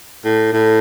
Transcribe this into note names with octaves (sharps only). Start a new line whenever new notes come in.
A2
A2